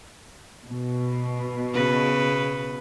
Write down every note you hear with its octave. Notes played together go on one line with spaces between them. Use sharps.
B2
C#3 B4